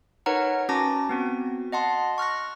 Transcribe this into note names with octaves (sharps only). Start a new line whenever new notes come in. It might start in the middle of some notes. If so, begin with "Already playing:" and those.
D#4 A#4 B4 C#5 F#5 A#5
C#4 F#4 A5 A#5 D6 A#6
B3 C4 F#4
D#5 F#5 A5 C6
C#6 F6 F#6 A#6